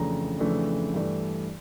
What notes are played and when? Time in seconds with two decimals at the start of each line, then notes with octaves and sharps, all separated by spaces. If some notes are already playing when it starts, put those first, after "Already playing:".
Already playing: F2 C#3 E3 A3 D4 A#5
0.39 F2 C#3 E3 A3 D4
0.94 G2 E3 A3 D4